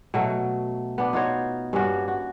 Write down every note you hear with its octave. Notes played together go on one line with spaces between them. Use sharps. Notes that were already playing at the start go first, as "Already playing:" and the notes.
B2 F#3 A3
B3 D4
D#4 F4 F#4 C#5
G2 A#3 C#4 F#4
F#4